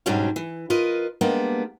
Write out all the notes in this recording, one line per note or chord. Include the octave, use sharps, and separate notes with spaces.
G#2 B2 F#3 G3 C#4 D4
E3
F4 A#4 B4 D#5
G3 G#3 A#3 B3 D4